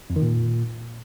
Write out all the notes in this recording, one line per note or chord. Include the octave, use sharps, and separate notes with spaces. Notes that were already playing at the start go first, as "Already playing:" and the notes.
F2
D#3
A#2